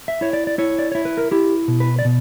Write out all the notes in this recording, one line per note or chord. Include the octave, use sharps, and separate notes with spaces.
E5
E4 C#5
D5
D5
E4 C#5
D5
E4 C#5
B4
A#4
E4 G4
B2
B4
D5
B2